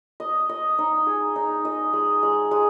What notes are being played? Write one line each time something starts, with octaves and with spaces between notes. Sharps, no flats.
D#5
D#5
D#4
G#4
D#4
D#5
G#3
G#3
G#3